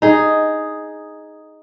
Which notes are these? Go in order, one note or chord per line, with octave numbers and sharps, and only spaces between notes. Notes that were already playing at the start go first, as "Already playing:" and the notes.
D#4 G#4